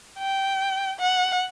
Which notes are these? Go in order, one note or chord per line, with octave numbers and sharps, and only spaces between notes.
G5
F#5